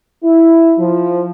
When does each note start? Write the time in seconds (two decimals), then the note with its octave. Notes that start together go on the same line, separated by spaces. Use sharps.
0.23 E4
0.77 F3